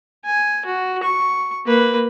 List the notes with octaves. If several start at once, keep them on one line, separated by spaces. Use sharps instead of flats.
G#5
F#4
C#6
A#3 B4